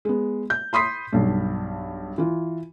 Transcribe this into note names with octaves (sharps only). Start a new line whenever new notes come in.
G#3 B3
G6
B5 C6 D#6 B6 C7
B1 G2
E3 F4